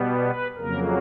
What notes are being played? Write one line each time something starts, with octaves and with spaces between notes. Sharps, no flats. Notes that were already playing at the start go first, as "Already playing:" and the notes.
Already playing: B2 G3 B3
B4
F2 C#3 F#3 A#3 A#4